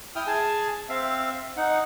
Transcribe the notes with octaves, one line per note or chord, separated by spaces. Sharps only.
E4 G5 D#6 F6
G#4 G#5 A5
C4 E5 F5
D#4 F#5